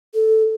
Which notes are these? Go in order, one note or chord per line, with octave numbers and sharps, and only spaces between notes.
A4